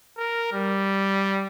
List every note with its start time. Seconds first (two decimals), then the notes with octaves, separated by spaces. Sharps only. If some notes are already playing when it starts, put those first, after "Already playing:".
0.17 A#4
0.53 G3